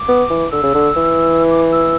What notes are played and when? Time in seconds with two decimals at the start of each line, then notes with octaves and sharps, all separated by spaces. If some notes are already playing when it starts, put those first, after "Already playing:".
Already playing: D6
0.08 B3
0.30 E3
0.51 D3 E6
0.63 C#3
0.74 D3
0.96 E3
1.50 D6
1.72 E6